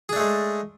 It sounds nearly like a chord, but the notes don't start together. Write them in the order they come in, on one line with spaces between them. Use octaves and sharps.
G#4 D4 A3 G#3